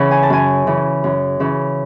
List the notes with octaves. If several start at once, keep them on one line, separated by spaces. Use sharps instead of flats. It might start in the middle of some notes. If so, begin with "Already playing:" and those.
Already playing: C#3 E3 F#5
G#5
A5
F#2 G#5
C#3 E3
F#2
C#3 E3